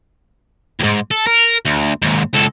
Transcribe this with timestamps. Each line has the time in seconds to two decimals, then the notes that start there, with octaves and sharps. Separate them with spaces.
0.80 D#2 G#2
1.11 A4
1.27 A#4
1.66 D2
2.02 D#2 G#2
2.33 C#2 A4